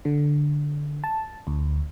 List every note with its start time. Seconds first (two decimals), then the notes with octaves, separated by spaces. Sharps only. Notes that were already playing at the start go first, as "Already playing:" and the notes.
0.05 D3
1.04 A5
1.47 D2